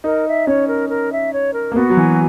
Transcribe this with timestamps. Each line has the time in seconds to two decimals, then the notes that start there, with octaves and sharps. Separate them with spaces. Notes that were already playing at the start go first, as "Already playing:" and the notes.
0.04 D#4 A#4
0.26 E5
0.47 C#4 C#5
0.68 A#4
0.90 A#4
1.11 E5
1.33 C#5
1.54 A#4
1.72 A#3
1.75 B3 F#4
1.90 F#3
1.97 E3 G#5